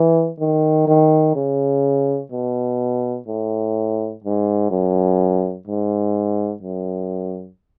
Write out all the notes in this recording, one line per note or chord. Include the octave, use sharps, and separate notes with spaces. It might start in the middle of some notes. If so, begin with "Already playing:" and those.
Already playing: E3
D#3
D#3
C#3
B2
A2
G#2
F#2
G#2
F#2